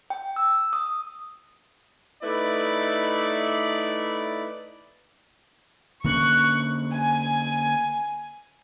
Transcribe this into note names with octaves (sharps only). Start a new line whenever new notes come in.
G5
E6
D#6
A3 D#4 E4 B4 D5
D3 A#3 C#4 C#6 F#6
G#5